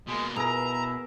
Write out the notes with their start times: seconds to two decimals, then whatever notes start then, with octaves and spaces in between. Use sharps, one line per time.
0.08 B2 G#3 A#3
0.36 B2 E4 G#4 A#4 A#5